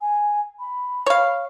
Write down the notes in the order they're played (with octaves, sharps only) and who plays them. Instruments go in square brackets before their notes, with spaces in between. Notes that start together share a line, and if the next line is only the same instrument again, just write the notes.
[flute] G#5
B5
[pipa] C#5 F5